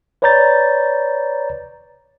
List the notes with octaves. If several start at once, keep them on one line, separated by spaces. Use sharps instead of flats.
B4 C#5 D5 A#5 G6 A6